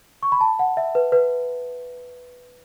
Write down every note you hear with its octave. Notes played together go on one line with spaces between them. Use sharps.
C#6
B5
A5
F#5
E5
B4
B4